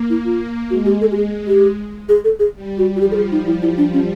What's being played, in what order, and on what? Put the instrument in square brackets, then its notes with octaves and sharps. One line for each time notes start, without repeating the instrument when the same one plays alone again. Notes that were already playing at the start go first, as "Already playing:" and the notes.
Already playing: [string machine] A#3
[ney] E4
F4
[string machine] G#3 [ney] F#4
[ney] G4
A4
G4
G#4
G4
G#4
A4
G#4
[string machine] G3
[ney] F#4
F#4
[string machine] F3 [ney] G4
[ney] A4
G#4
D#4
E4
E4
D4
C#4